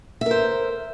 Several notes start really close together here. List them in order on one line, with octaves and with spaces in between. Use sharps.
E5 A#4 C5